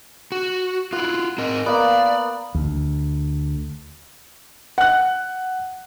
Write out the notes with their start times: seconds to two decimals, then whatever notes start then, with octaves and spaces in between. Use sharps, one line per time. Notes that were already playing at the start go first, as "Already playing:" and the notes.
0.32 F#4
0.93 E4 F4 F#5
1.38 C4 A#4 D#5
1.66 A#3 B3 D5
2.55 D2
4.78 F#5 F#6